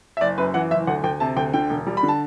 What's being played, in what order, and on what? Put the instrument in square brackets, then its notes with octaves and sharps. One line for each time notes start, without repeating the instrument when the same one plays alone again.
[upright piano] E5
F#1 D5
F#2 B4
E3 F#5
F#1 E5
D2 F#5
D2 G5
C3 A5
D2 G5
D3 G5
E1
G3
B5
D3
A5